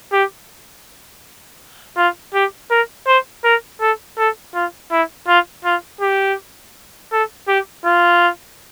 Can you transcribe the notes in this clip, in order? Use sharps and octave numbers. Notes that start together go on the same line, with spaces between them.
G4
F4
G4
A#4
C5
A#4
A4
A4
F4
E4
F4
F4
G4
A4
G4
F4